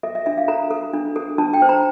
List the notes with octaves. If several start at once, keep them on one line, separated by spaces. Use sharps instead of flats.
A4 E5
E5
D4 E5
F5
A4 A#5
A4
D4
A4
D4 A5
G5
C5
A#5